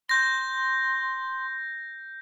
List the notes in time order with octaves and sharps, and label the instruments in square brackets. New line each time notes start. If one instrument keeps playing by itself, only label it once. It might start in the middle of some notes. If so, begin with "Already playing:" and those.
[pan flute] C6 [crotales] G6 A#6